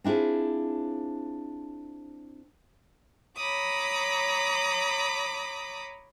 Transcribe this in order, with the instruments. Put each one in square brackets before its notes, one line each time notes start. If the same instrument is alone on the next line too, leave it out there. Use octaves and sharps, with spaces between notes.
[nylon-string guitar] C4 D4 E4 F4 G#4
[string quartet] C#5 A#5 B5 D6 D#6